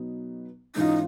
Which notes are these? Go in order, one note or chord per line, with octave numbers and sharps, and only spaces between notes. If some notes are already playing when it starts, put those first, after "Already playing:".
Already playing: B2 F#3 B3 D#4
G#2 E3 G#3 C#4 D#4 F4